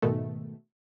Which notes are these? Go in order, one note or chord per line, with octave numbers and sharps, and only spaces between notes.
G#2 B2 D#3 A3